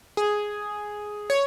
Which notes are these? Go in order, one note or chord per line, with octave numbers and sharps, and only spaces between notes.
G#4
C#5